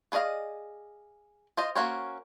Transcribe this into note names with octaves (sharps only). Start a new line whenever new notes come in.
B3 G#4 D5 D#5 F5
F4 C5 D#5
A#3 C#4 F#4 C5 C#5